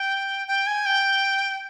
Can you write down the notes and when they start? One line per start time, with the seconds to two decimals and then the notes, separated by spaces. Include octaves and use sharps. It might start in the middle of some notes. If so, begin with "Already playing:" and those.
Already playing: G5
0.48 G5
0.67 G#5
0.86 G5